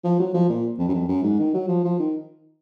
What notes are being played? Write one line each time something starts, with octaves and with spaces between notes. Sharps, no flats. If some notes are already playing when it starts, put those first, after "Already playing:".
F3
F#3
F3
A#2
F2
F#2
F2
F#2
G#2
D#3
F#3
F3
F3
D#3